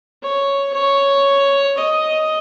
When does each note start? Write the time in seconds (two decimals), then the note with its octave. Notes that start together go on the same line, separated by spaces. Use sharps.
0.23 C#5
0.74 C#5
1.78 D#5